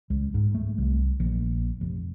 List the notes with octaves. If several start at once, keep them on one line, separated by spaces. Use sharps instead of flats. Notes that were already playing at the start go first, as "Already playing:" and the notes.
C#2
G#2
A3
C2
A#1
F1